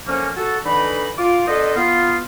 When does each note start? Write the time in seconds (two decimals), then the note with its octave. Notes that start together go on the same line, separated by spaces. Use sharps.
0.07 D3 F3 A#3 C#4
0.37 F#4 A4
0.66 D3 E3 D#4 B5
1.18 F4 D6
1.48 B3 D4 A4 B4 C5 D#5
1.76 B3 F4